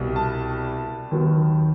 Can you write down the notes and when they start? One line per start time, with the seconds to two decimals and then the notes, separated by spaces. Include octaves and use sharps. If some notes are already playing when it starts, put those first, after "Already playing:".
Already playing: C2 B2 G3
0.16 A5
1.11 D#2 D#3 F#3 B3